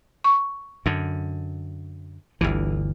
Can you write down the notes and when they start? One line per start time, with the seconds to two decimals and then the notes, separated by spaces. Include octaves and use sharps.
0.24 C#6
0.86 F#2 D3
2.41 G1 D2 E3